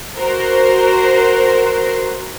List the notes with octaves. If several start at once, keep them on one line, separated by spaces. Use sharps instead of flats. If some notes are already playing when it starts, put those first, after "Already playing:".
F#4 A#4 C5